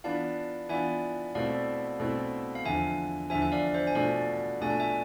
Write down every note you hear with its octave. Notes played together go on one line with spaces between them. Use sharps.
E3 B3 D4 F4 F5 A5
E3 B3 D4 F4 E5 G#5
B2 A3 C4 E4 D5 F5
B2 A3 C4 E4
F5
E2 D3 F3 E5 G#5
E2 D3 F3 E5 G#5
E5
D5 F5
C5 E5
G#5
B2 A3 D4 F4 D5 F5
B2 A3 D4 F4 G#5
A5
E5 G#5